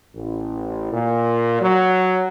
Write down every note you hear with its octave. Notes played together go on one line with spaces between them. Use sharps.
A1
A#2
F#3